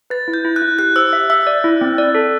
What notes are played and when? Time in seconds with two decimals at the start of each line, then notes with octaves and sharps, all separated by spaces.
0.10 B4 A6
0.28 E4
0.34 G6
0.45 E4
0.56 F#6
0.62 E4
0.79 G4 F#6
0.96 C5 E6
1.13 E5
1.30 E5 E6
1.47 D5
1.64 E4
1.81 C4
1.98 D5
2.15 A4